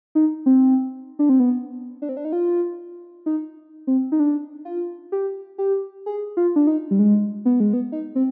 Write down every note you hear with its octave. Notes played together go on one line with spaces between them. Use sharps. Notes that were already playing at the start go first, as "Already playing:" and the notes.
D#4
C4
D4
C4
B3
D4
C4
D4
D#4
F4
D#4
C4
D#4
D4
F4
G4
G4
G#4
F4
D4
D#4
G3
G#3
B3
G#3
B3
D#4
C4